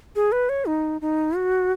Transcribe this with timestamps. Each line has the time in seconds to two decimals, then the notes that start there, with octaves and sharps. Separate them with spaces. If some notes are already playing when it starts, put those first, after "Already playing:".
0.16 G#4
0.32 B4
0.49 C#5
0.67 D#4
1.01 D#4
1.36 F#4